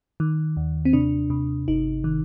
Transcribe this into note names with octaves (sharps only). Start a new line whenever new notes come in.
D#3
D#2
C4
C3 D4
C3
G1 D#4
D#3